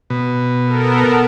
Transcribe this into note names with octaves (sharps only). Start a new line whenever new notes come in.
B2
B3 A4 A#4